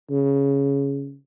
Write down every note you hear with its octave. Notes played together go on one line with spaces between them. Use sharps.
C#3